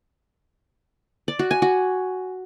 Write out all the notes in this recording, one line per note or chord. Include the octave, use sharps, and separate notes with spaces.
D5
F#4
G#5
F#4